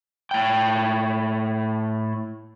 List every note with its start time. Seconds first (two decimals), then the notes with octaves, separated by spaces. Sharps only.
0.31 A2 G5